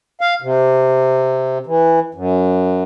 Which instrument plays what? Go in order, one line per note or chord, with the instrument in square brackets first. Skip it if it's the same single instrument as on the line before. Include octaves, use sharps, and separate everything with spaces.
[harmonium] F5
C3
E3
F#2